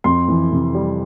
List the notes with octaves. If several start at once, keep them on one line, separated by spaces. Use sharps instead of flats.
F2 C6
E3
C3
G3